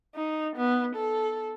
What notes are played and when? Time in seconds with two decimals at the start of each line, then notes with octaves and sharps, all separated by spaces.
0.15 D#4
0.56 B3
0.96 A4